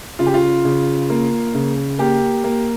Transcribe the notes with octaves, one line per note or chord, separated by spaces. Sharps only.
C#3 F4
G4
F4
C#3
A#3
C#3
A#3 G4
A#3